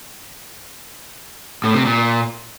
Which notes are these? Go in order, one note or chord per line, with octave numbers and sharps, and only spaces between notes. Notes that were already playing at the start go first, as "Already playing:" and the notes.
A2
C3
A#2